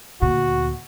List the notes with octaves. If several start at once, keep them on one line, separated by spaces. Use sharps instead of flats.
D2 A#2 F#4